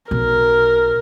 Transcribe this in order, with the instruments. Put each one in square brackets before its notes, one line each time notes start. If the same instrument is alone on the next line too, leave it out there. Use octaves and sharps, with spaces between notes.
[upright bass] B1 [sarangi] A#4